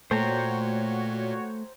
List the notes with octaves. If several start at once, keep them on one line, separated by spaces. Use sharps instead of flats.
A#2 A3 F#4 C5 C#5 G5 A#5